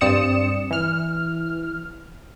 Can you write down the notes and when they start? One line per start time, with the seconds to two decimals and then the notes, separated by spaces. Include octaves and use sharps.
0.01 G2 C4 D5 D#6 C#7 E7
0.71 E3 F6